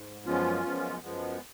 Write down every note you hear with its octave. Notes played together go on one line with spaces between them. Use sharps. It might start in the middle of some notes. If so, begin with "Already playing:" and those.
Already playing: G#2
F#2 F3 G#3 B3 C#4 F4
F#2 F3 G#3 B3
F#2 F3 G#3 B3